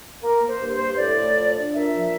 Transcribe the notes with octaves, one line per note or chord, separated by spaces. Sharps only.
A#3 A#4
A#3
C5
G2
C5
G2
A2 D5
A2
F3
D4
A#2 E5
F3